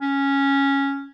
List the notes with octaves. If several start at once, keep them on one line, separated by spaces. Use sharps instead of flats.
C#4